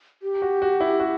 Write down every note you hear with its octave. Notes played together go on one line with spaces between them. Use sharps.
G4
F#4
F#4
E4
F#4